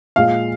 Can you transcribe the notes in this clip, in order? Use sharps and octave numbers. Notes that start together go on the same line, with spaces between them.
A#2 F3 G#3 F5